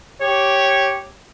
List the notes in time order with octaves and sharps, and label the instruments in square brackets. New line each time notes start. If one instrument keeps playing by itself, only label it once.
[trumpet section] G4 C#5